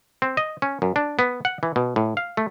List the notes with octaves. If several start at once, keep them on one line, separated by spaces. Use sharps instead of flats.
C4
D#5
C#4
F#2
D4
B3
F#5
E3
B2
A2
F5
A3